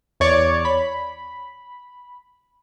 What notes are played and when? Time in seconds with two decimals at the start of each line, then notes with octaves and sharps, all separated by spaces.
0.20 E2 C#5 D5
0.65 B5